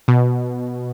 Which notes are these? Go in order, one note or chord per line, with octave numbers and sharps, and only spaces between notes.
B2